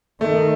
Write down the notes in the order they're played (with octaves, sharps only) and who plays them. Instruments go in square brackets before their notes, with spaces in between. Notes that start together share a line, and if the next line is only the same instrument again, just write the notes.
[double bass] D#3 [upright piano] A3